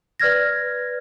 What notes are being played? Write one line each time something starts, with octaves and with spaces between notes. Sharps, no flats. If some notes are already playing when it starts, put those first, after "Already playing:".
B4 D5 F6 G#6 A#6